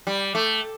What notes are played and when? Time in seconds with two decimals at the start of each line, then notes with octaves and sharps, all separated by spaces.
0.07 G3
0.35 A3